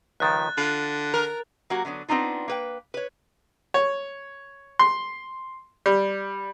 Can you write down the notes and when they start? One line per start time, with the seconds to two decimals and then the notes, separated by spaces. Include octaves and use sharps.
0.20 C#2 D#3 F3 F#6 A6
0.58 D3 F4
1.14 A#4
1.70 F#3 A#3 F#4 G4
1.85 D3 F#3 B3 D4
2.09 B3 C4 D4 D#4 F4
2.48 A#3 B4 G5
2.94 B4 C#5
3.74 C#5
4.79 C6
5.86 G3